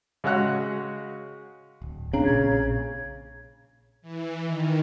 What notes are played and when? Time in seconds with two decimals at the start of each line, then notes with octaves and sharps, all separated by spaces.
0.24 C#3 G#3 F#4 C#5 F#5 F#6
1.82 D1
2.13 C#3 C4 D4 A#5
2.25 A#1 A#2 G#6
4.02 E3
4.45 D#3